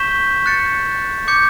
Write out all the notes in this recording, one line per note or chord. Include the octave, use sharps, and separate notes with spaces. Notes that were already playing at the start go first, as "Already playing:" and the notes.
Already playing: C#6 G6 B6 E7 G7
F#6 A6 C#7
D6 G6 C#7